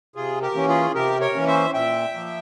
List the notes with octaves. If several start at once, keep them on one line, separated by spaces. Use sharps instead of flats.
C3 F4 G#4
G4 A#4
E3 A#3 C#4
F4 G#4
C3 G4 A#4
A#4 C#5
E3 A#3 C#4
C5 E5
A#2 E5 G5
F3 A#3